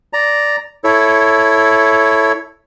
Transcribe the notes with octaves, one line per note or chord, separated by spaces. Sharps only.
D5 A#5
E4 A4 C#5